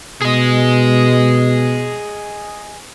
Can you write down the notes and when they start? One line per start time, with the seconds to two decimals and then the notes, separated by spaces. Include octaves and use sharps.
0.21 B2 G#4 D#5